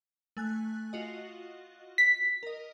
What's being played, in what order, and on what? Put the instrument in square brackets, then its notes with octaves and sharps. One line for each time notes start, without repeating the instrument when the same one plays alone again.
[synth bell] A3 G#5 F#6
F4 F#4 D#5
[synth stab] B6
[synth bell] A#4 D#5